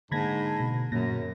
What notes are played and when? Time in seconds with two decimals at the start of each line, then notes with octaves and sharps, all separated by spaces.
0.11 G#2 D3 A#3 A5 B5 G#6 A#6
0.60 B2
0.92 F#2 A#2 F#3 A#6